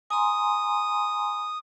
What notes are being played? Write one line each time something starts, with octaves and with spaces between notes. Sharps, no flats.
G#5 A#5 C6 D#6